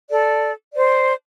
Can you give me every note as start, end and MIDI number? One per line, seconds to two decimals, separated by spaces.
0.10 0.51 69
0.10 0.51 74
0.75 1.13 72
0.75 1.13 74